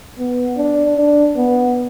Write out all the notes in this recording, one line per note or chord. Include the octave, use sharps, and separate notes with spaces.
B3
D4
D4
B3